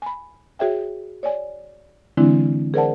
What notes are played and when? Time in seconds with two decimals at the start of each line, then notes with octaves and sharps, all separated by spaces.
0.02 G#5 B5
0.59 F#4 G#4 C#5 E5 G5
1.23 C#5 D5 G#5
2.17 D3 E3 G#3 C4 D4 E4
2.74 G#4 A#4 C5 D5 F#5 A5